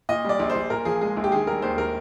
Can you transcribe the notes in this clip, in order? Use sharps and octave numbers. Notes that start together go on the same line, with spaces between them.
A#2 D#5
G3 D5
A#1
C5
A#1
A#2 A#4
F3 G#4
G#3 G#4
A#1
G4
D#3 G#4
G3 A#4
D#2 C5
A#4